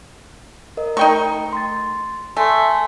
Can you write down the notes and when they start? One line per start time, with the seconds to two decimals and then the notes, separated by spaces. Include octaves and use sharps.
0.77 A#4 D#5
0.97 A3 D#4 G5 C#6 C#7
1.53 C6 A6
2.37 A3 G#5 C6